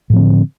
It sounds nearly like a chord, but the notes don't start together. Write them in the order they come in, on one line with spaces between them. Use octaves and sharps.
A2 F3 C4 D3